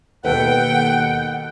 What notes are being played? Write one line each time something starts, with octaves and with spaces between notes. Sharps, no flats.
D#2 B2 A4 B4 F#5 G5